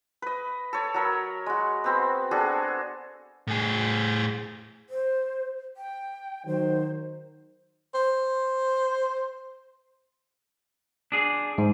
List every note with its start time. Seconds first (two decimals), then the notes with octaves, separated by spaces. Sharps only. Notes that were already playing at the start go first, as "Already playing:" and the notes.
0.22 B4 D#5
0.73 A4 C#5
0.94 F#3 A#4 B5
1.46 G#3 F#4
1.84 B3 C4 F#4
2.31 D4 F#4 G#4 A4
3.47 A2 G#4
4.89 C5
5.77 G5
6.46 D#3 F#3 C5
7.95 C5
11.12 D4 G#4
11.58 G#2